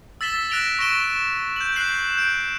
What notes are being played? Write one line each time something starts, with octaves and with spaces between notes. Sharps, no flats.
E6 A6 B6 E7 G7
F#6 A#6 D7 F7 G7
C#6 A#6 D7 E7 G7
G6 F#7
F#6 G6 C7 E7 F#7
G6 D7